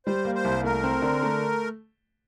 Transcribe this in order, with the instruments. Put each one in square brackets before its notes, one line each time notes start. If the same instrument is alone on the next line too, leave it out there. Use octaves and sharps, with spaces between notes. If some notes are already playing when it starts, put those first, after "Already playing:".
[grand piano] G3 [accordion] C5
[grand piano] A#3
[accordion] C5
[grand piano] C2
[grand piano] A3 [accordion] A#4
[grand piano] C4
D3
A3